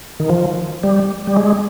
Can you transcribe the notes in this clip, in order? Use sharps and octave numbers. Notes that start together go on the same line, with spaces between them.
D#3
F3
G3
G3
G#3